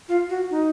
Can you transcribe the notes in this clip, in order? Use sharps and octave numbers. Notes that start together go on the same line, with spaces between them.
F4
F#4
D#4